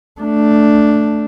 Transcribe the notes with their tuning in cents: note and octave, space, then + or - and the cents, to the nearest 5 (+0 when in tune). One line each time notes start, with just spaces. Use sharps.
A3 +0 D4 +0